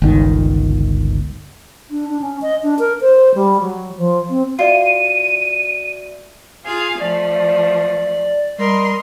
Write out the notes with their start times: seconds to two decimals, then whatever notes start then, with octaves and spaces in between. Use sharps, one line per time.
0.02 G1 C#2 D#3
1.91 D4
2.09 D4
2.22 C#4
2.42 D#5
2.63 D4
2.79 A#4
3.01 C5
3.35 G3
3.61 F#3
3.97 F3
4.30 C4
4.59 F4 F#4 D5 E5 D#7
6.65 F4 G#4 F5
7.00 F3 A3 D5
8.58 G3 A#4 D#5 C6